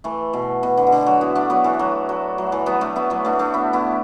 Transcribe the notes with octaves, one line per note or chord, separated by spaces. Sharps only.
E3 A3
B2
B2
D3
B2
D3
F#3
B3 E4
A3 D4
F#3 B3
E3 A3
F#3
F#3
F#3
E3 A3
F#3 B3
A3 D4
B3 E4
F#3 B3
A3 D4
A3 D4
B3 E4
B3 E4